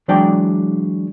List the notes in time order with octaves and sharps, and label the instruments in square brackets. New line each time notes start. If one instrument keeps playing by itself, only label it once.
[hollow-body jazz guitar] E3 F#3 G#3 D4 D5 G5